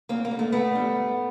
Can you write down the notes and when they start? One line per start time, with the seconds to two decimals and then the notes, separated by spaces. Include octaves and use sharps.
0.09 D2 A#3 C4
0.25 A#3
0.31 G3
0.35 D3 A3
0.52 D2 A3 B3
0.75 D3 G3
0.96 G#2